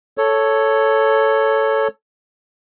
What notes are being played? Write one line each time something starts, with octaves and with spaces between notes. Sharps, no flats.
A4 C#5